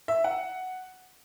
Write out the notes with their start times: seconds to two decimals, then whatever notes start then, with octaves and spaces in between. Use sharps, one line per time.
0.08 E5
0.24 F#5